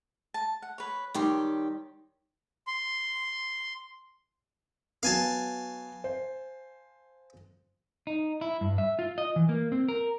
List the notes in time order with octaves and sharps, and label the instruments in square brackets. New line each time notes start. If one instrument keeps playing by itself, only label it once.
[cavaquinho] A5
F#5
B4 C#5
[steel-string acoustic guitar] D#3 G3 G4 [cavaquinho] C#5 G5 C6
[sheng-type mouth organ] C6
[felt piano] F#3 B3 [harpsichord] F5 G#5 A5
[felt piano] C5
[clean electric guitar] D#4
E4
G2
E5
F4
D#5
E3
A#3
C4
A#4